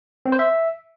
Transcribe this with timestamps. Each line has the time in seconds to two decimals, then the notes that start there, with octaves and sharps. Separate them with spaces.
0.26 C4
0.32 C5
0.39 E5